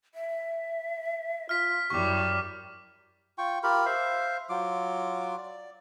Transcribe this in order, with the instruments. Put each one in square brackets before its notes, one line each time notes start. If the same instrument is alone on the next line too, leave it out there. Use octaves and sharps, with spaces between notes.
[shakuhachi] E5
[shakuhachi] F4 [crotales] F6 B6
[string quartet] F#2 G3 [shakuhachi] E4 [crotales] C#6 D6
[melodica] F4 G5 C#6
F4 G4 A#4 B5
C5 E5 F5
F#3 F4 D6
D5